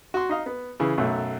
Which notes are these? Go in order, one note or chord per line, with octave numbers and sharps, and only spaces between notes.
F#4 C6
D#4 D#5 F5
B3
C#3 E3 G#4
B1 F#2 F#3 A3